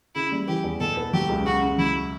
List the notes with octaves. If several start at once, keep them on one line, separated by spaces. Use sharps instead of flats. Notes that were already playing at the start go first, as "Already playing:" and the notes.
C#3 E4
G3
E3 G4
E2
B2 A4
B3
F#3 G4
C#2
C#3 F#4
C#4
F#3 E4